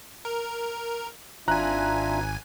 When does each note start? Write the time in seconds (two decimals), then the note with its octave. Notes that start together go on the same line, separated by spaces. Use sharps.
0.25 A#4
1.48 G#1 D4 F4 E5 G#5 A#5 F#6